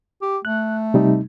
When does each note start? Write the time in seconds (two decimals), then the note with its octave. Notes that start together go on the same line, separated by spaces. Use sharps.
0.22 G4
0.45 A3 F#6
0.94 C3 G3 D#4